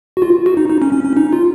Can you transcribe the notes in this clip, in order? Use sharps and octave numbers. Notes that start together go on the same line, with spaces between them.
F#4
F4
F#4
D#4
D#4
C#4
C#4
C#4
D#4
F4